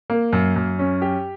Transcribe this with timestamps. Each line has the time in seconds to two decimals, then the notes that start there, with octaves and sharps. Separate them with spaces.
0.10 A#3
0.33 F#2
0.56 F#2
0.79 C#4
1.02 G4